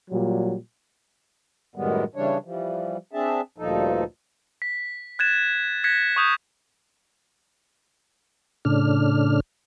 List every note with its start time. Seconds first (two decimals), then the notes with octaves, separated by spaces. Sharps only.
0.11 A#2 F#3 G3
1.75 F#2 A2 D#3 G3 G#3 B3
2.15 C#3 E3 G3 D4 C#5
2.44 E3 F3 G3
3.13 C4 D4 G#4 E5 A5
3.58 D2 G2 A#2 F3 D#4 A4
4.62 B6
5.19 F#6 G#6 A6 E7
5.84 F#6 G#6 A#6 B6 C#7
6.16 C#6 D#6 G6 E7
8.65 A2 C#3 D4 F6